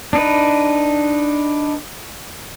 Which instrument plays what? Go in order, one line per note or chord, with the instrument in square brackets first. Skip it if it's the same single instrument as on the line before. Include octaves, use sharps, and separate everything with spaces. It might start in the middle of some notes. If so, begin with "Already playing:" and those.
[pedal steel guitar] D4 D#4 B4